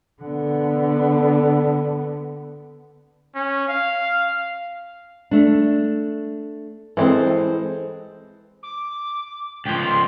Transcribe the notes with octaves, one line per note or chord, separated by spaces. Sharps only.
D3 B3
C#4
F5
A3 D4
E3 G#3 C4 A4 C5
D6
C#2 F3 G5
C6